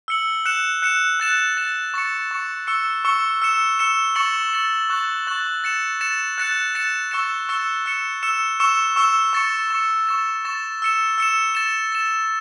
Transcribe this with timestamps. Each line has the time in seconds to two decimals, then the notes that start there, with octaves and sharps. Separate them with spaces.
0.08 E6 C#7 F#7
0.46 F#6 C#7 E7
0.82 F#6 C#7 E7
1.20 F#6 A6 E7
1.57 F#6 A6 E7
1.94 C#6 A6 C#7
2.31 C#6 A6 C#7
2.67 C#6 E6 C#7
3.05 C#6 E6 C#7
3.42 E6 C#7 E7
3.79 E6 C#7 E7
4.15 C#6 A6 C#7 F#7
4.53 C#6 A6 C#7 F#7
4.90 C#6 F#6 A6 F#7
5.27 C#6 F#6 A6 F#7
5.64 A6 C#7 E7
6.01 A6 C#7 E7
6.38 F#6 A6 C#7 E7
6.74 F#6 A6 C#7 E7
7.11 C#6 E6 A6 C#7 E7
7.49 C#6 E6 A6 C#7 E7
7.86 E6 C#7 E7
8.23 E6 C#7 E7
8.60 C#6 E6 C#7 E7
8.96 C#6 E6 C#7 E7
9.33 C#6 A6 C#7
9.70 C#6 A6 C#7
10.07 C#6 A6 E7
10.45 C#6 A6 E7
10.82 E6 C#7 E7
11.18 E6 C#7 E7
11.55 A6 E7
11.92 A6 E7